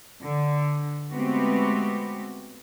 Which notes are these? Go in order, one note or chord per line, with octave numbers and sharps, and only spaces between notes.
D3
G#3 A3 B3 C4 F#4 G4